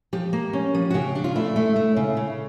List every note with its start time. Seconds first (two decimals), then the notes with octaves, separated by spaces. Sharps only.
0.13 F3 G4
0.33 A#3
0.53 C#4
0.75 F3
0.90 F#4
0.94 C#3 G4
1.15 D4
1.24 F4
1.35 A3 E4
1.56 A3
1.76 A3
1.97 C#3
2.17 C#3